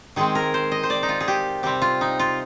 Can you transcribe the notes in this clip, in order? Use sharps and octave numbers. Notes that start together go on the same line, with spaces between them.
D#3 G#3 C4 G#4
A#4
C5
D#5
C5
D5
D#4
F4
G#4
G4
C3 G3 C4 G4
F4
D#4
F4